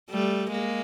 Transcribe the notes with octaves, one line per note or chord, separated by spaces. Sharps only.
G3 A3
G#3 A#3